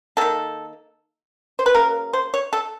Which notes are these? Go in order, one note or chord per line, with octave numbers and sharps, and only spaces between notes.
D#3 G3 A#3 A4
C5
B4
C#3 F#3 A#3 A#4
C5
C#5
A4